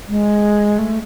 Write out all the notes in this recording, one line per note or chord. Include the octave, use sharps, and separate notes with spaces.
G#3
A3